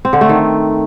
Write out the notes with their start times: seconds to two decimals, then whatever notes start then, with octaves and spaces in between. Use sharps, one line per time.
0.05 C4
0.13 D3
0.21 A3
0.29 D#3